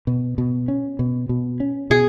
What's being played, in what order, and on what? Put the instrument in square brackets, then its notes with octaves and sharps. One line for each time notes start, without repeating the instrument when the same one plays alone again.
[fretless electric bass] B2
B2
C#4
B2
B2
C#4
[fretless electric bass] B2 [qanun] G#4